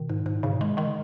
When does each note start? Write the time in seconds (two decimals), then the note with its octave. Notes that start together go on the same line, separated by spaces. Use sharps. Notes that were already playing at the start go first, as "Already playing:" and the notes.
Already playing: B2 D#3
0.09 G#2
0.26 G#2
0.43 G#2 C#3
0.52 B2
0.60 D#3 G#3
0.77 D#3 G#3
0.86 C#3